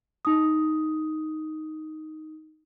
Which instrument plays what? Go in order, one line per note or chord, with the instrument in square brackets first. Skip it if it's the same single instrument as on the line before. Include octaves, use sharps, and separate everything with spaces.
[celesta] D#4 D#6